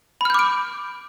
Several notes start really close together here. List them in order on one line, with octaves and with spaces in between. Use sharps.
B5 F6 G6 D6 D7